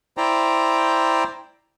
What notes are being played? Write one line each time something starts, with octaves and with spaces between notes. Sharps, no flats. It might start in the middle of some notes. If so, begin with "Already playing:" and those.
E4 C5 D5 G5 A#5